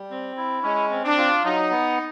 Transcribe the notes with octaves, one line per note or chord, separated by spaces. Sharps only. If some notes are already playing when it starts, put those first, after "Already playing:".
Already playing: G3
C4
E4
G#3 C#4
C4
D4
F4
F#3 D#4
B3